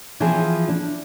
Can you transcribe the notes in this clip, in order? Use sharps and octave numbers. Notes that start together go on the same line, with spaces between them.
E3 F3 B3 C4 F4 G#4
D4